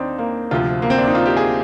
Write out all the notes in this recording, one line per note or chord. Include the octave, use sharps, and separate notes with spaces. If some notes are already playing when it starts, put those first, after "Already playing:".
Already playing: D#2 C4 D4 D#4
A#3
D2 C3 F3 F4
A#3
C4
D4
D#4
F4
G4
G#4